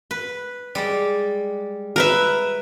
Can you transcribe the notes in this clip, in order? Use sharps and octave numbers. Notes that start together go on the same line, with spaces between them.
B4
G3 G#3 D5
A#4 B4 E5